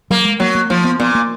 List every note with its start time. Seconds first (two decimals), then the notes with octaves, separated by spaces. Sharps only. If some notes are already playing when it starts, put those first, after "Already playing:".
0.11 F#3 A#3
0.25 G#3
0.40 F#3 A#3
0.55 A#3
0.70 F3 A#3
0.84 B3
1.00 A#2 B3
1.15 A#3